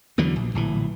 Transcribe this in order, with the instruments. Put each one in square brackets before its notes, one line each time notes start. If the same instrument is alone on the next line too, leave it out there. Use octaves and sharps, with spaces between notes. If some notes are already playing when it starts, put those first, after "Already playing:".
[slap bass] E2 D3 E3 F#3
A#1
D1 A#1 E3